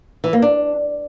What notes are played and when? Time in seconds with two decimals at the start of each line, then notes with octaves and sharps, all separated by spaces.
0.24 E3
0.33 A#3
0.42 D4